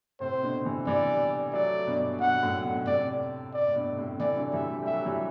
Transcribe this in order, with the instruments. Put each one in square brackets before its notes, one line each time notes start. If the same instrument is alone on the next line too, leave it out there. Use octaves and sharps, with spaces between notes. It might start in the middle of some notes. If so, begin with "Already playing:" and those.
[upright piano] A2 C3 [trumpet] C5
[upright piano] B2 D3
C3 E3
[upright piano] E3 G3 [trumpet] D5
[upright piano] F#3 A3 [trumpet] D5
[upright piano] G2 B2
[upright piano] G2 B2 [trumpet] F#5
[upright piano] F#2 A2
G2 B2
[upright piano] A2 C3 [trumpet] D5
[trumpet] D5
[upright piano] A2
G2 B2
A2 C3
[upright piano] C3 E3 [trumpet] D5
[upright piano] D3 F#3
[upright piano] E3 G3 [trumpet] E5
[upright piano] A3
[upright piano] G3 [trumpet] E5
[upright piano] F#3
E3 G3